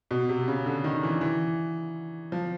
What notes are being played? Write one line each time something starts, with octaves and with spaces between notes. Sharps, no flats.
B2
C3
C#3
D3
D#3
E3
E3
F3